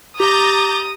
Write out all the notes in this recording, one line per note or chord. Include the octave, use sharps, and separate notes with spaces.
G4 A#5 D6 D#6 G6 A6